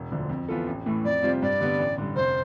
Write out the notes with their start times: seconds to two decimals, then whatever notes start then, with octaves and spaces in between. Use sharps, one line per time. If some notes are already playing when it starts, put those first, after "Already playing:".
Already playing: E1
0.12 D2 D3 F3
0.29 F2
0.48 E3 B3 F4 A4
0.67 A1
0.86 A2 E3 A3
1.05 F2 D5
1.23 C3 G3 C4 F4
1.42 G2 D5
1.61 D3 G3 B3 D4
1.79 A1
1.98 G2 D3
2.16 F1 C5